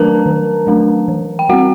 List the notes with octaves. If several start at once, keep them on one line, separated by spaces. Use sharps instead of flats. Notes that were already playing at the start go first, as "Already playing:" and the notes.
Already playing: D#3 F#3 A3 D4 A#4 B4 A5 A#5
D#3
F#3 A3 D4
E3
G5
G3 C4 F#4 F#5